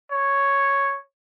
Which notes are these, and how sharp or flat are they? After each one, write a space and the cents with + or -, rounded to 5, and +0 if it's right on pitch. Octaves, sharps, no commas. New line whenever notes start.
C#5 +0